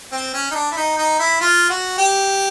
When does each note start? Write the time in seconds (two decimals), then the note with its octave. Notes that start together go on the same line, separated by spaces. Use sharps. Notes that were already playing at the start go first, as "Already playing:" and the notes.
0.12 C4
0.34 C#4
0.51 D#4
0.55 D4
0.72 E4
0.77 D#4
0.98 D#4
1.19 E4
1.41 F4
1.70 F#4
1.98 G4